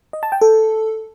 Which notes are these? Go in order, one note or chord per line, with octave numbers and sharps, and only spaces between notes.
D#5
A5
G5
A4